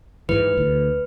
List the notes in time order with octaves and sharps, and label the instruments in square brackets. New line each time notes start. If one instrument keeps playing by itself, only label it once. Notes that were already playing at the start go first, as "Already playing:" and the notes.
[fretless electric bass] G#2 E3 [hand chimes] B4
[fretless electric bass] D2